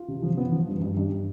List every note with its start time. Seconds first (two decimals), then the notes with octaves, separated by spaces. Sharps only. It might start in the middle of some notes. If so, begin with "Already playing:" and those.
Already playing: F4
0.08 C3
0.23 F3
0.37 B3
0.52 F3
0.67 G2
0.82 G2
0.97 G2